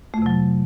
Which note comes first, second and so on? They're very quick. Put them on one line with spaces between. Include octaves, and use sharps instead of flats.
A3 F2 C3 F#3